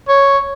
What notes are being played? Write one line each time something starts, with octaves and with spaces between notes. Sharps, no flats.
C#5